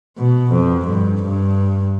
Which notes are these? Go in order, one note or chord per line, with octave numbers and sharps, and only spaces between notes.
B2
F2
G2
G2